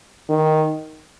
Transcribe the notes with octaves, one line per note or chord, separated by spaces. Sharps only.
D#3